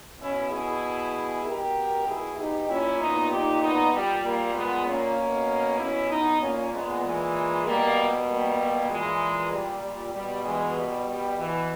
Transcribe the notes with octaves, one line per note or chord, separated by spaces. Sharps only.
B2 C#4 E4
E4 G#4
B2 G4 A#4
E4 G#4
D#4 G4
A#2 C#4 E4
B3 D#4
D#4 G4
B3 D#4
A#2 G3
G3 A#3
G#3 B3
A#3 C#4
B2
C#4 E4
B3 D#4
A#2 A#3 C#4
G#3 B3
E3 G#3
B2 G3 A#3
G3 A#3
A#2 E3 G#3
G3
G3
B2 G3
E3 G#3
G3
G3
B2 E3